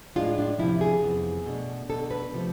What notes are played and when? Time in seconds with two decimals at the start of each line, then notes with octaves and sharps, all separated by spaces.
0.15 A2 G#3 D4 F4
0.38 D4
0.59 E2 C3 F3 E4
0.81 G#4
1.03 F2 C3 E3 B3
1.46 B2 A3 D4
1.89 B2 B3 D4 A4
2.11 B4
2.33 C3 F3 A3